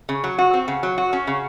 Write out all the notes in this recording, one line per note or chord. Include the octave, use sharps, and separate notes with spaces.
C#3
F#3
F#4
C4
C#3
F#3
F#4
C#4
C#3